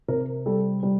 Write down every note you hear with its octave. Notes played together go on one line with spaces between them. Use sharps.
C3 A#4
G3 A4
G3